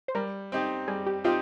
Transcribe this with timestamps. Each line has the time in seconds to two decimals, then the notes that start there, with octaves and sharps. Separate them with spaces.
0.08 C5
0.15 G3 A#4
0.52 C4 D#4 G4
0.88 G3 G#4
1.06 G4
1.24 C4 D#4 F4 G4